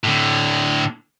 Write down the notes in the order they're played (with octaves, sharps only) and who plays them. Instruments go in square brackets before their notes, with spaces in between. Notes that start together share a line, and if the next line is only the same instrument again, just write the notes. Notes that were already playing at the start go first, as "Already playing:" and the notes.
[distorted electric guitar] A2 D3